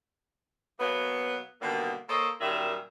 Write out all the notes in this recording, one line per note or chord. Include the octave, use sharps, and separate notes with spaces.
B2 F#3 A#3 B3
B2 D3 D#3 G3 A#3
A#3 A4 C5 C#5 D#5
F#2 A#2 D#3 G3 E5